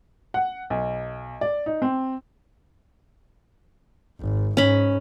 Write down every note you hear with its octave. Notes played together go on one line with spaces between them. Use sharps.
F#5
B1
D5
D#4
C4
G#1
G#2 C#4 B5